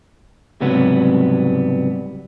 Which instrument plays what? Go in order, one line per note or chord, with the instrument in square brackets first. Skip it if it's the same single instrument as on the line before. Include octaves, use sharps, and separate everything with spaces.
[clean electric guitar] C#2 G#2 C3 F#3 G3 B3